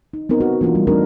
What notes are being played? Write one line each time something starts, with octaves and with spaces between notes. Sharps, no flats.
D#4
B3 C4 D#4 A#4
F#4
E3 A#3 D4 F4
G3
A3 C4 D4 D#4 A#4